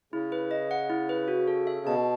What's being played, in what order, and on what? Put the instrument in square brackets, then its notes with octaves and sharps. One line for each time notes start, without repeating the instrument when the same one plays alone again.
[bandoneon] C#3 [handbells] E4
[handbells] B4
D#5
F#5
E4
B4
F#4
A4
E5
[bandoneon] B2 [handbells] A5